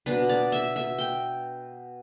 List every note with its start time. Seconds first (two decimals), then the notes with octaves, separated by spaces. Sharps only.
0.06 B2 B3 D4 B4
0.29 D5
0.52 E5
0.76 E5
0.98 G5